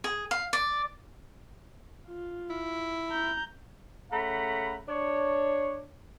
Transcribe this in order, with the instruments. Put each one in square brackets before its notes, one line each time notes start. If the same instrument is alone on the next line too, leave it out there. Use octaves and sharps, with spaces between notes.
[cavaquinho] G#4
F5
D5
[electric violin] F4
[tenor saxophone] E4
[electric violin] A#5 G6
[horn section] C#3 A3 F#5 A#5 B5
D4 C#5